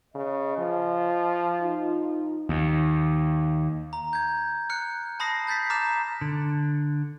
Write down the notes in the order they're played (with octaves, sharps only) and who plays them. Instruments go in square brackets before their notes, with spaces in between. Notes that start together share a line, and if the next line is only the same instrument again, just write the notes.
[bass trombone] C#3 [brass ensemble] D#5
[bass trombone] F3
[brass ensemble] D#4 F4
[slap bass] D#2
[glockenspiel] A#5
G6 G#6
F6 F#6 C#7
A5 B5 D#6 A#6 C7
A5 G6 A6 B6 C7
A#5 D6 F6 A6 E7
[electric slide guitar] D3